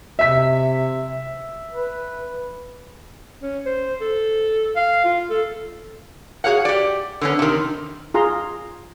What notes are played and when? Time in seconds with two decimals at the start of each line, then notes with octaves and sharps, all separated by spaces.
0.19 C3 E5 B6
1.71 B4
3.42 C#4
3.66 C5
4.01 A4
4.76 F5
5.04 F4
5.29 A4
6.44 F#4 G#4 C#5 F5 F#5
6.65 G4 D5
7.21 D3 B3 C#4
7.39 C3 D#3
8.14 F4 G#4 A#5 C6